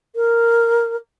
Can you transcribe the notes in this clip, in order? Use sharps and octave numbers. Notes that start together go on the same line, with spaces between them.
A#4